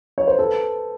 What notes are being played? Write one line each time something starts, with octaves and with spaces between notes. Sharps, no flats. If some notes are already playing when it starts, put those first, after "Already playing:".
C#5
C5
A4 B4